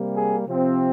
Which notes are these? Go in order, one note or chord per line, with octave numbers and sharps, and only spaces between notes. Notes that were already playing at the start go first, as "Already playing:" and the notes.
Already playing: C3 G3 A#3
G#4
C3 F3 C4